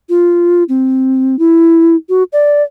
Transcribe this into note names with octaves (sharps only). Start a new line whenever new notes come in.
F4
C4
E4
F#4
D5